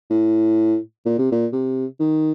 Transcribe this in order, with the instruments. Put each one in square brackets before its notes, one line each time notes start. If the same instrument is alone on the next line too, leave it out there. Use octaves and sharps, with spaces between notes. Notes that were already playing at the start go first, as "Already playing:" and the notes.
[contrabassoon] A2
A#2
C3
A#2
C3
D#3